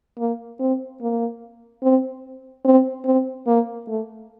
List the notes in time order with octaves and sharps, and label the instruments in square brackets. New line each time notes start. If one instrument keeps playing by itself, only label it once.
[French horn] A#3
C4
A#3
C4
C4
C4
A#3
A3